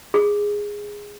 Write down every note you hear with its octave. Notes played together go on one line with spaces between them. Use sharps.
G#4